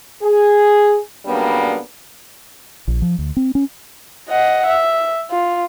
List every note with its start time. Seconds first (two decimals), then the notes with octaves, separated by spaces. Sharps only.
0.23 G#4
1.26 C#3 F#3 G3 A#3 B3 D4
2.88 A#1
3.02 F3
3.18 D2
3.37 C4
3.55 C#4
4.29 D#5 F#5
4.66 E5
5.31 F4